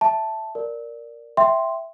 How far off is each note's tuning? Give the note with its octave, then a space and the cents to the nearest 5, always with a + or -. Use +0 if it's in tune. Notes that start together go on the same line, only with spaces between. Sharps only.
E5 +0 A5 +0
A#4 +0 D5 +0
E5 +0 G5 +0 C6 +0